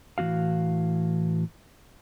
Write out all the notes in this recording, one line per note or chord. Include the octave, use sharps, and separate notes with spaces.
A2 E3 A#3 F#4 F5